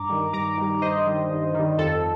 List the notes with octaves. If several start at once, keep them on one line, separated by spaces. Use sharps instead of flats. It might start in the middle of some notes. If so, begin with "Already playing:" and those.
Already playing: G2 A#5 D6
D#3 G3
G2 A#5 D6
D#3 G3
G2 C5 D#5
D#3 G3
G2
D#3 G3
F2 A4